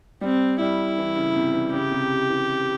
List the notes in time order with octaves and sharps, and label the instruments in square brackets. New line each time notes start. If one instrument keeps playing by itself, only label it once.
[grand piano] G3 [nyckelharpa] C4
[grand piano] G3 [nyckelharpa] E4
[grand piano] E3
C#3
C3
E3
[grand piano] C#3 [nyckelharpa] G4
[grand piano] C3
E3